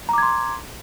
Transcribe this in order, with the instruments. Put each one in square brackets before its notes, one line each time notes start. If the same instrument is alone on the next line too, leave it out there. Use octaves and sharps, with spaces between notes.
[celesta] A#5
D6
G#6
C6